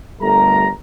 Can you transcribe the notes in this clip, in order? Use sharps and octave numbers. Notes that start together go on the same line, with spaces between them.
G1 G3 A3 A#4 A#5